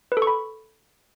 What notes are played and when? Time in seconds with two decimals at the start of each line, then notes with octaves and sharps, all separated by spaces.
0.12 B4
0.17 A4
0.22 C#6
0.27 B5